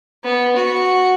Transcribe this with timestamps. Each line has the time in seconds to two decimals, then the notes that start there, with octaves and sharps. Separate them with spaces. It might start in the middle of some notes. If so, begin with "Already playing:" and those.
0.24 B3
0.56 F#4